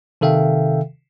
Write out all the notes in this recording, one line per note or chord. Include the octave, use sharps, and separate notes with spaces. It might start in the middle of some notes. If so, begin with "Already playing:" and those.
C3 D#3 A4 E5 F5 G5